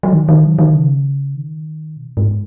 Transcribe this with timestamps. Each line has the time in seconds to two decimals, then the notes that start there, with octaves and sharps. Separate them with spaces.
0.03 F#3
0.13 D#3
0.29 D#3
0.44 F#3
0.59 D#3
0.75 C#3
1.35 D#3
1.97 B2
2.17 G#2